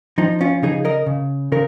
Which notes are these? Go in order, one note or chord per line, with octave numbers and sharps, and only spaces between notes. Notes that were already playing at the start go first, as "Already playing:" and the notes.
F3 D#4
C#4 F4
C#3 D#4 G#4
A#4 D#5
C#3
C#3 A#4